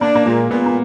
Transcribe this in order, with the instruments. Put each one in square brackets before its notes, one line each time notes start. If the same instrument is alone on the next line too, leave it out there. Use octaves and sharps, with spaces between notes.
[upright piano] A#3 [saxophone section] D4
[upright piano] A#3
[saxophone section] A#2 [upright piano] G#3
[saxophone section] A#2 [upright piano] B3
[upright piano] A#3